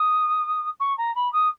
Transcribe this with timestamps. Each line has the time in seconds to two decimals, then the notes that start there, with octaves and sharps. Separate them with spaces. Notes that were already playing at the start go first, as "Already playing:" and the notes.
Already playing: D#6
0.80 C#6
0.97 A#5
1.15 B5
1.32 D#6